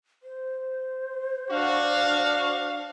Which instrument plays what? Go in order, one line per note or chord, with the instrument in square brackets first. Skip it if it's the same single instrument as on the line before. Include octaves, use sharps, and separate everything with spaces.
[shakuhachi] C5
[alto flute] D4 [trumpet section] F#4 [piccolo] F5